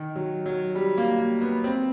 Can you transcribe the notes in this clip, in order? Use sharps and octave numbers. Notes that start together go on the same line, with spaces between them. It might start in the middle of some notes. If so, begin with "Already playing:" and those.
Already playing: D#3
F#3
F#3
G3
A#3
A#3
B3
C4